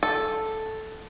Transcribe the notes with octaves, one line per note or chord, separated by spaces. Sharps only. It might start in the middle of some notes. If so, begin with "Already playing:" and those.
A4